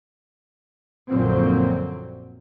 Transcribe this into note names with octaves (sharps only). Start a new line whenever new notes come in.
A#1 F#2 A#2 D3 F#3 C4